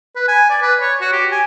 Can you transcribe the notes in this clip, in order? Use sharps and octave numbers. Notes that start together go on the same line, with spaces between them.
B4
G#5
D5
B4
C#5
F#4
G4
G#5